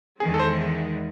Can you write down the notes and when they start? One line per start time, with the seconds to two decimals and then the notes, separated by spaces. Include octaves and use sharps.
0.20 E2 D#3 G#3 G#4
0.34 A4
0.39 C5